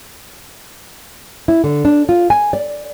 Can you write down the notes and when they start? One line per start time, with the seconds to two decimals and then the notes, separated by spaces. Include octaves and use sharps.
1.48 E4
1.64 D3
1.85 D4
2.09 F4
2.30 G#5
2.53 D5